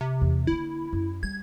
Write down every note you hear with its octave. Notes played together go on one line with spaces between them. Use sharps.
C3
E2
D3 A#3 E4
F#2
G3 G#6